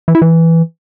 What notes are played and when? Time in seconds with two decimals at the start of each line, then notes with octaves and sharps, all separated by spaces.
0.08 E3
0.15 E4
0.22 E3